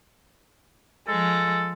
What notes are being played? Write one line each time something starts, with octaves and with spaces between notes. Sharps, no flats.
F3 G#3 A4